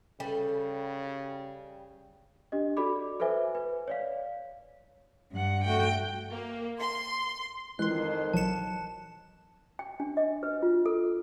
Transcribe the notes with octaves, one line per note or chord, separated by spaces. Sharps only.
C#3 G3 A4 B4
D4 G4 D#5
F#4 A4 D5 B5 D6
A4 B4 C5 E5 G#5
B4
C#5 D5 F5
G2 F#5
A3 F#4 G5
A#3
C6
F2 D#3 E3 G#3 C6 F#6
A#1 E3 F#3 A5 C#7 E7
G5
D4
D#5
B4
F4
A4